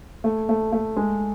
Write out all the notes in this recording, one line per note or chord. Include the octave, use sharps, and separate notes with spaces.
A3
A3
A3
G#3